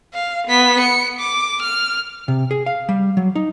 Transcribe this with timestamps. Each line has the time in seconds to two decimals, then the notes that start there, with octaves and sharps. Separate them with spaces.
0.14 F5
0.47 B3 B6
0.80 C#7
1.19 D6
1.62 F6
2.28 C3
2.51 G#4
2.66 F5
2.89 G3
3.17 F#3
3.35 D#4